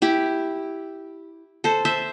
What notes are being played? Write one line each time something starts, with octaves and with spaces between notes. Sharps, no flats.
E4 G4
A4 C5
C5 E5